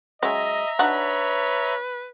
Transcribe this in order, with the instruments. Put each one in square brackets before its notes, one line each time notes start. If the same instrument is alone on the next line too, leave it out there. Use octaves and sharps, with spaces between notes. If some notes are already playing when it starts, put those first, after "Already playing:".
[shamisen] F#3 G#3 C#4 [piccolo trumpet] D#5 [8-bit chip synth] E5 A#5
[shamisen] D4 D#4 F#4 [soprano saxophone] B4 [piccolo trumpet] C#5